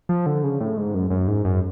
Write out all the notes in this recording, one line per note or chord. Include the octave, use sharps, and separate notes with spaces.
F3
D3
C#3
A2
G#2
F#2
F#2
G#2
F#2